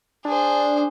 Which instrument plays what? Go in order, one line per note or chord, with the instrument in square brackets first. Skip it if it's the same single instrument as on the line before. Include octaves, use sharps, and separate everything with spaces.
[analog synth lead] D4 [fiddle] G#4 C5